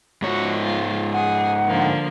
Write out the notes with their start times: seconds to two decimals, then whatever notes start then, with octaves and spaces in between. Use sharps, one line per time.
0.22 G#2 F#4 C#5
0.63 G#3 F4
1.13 G#4 F#5
1.66 D3 F3 A#3